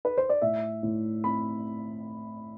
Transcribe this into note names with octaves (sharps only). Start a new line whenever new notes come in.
B4
C5
D5
A2 E5
A2
C4 B5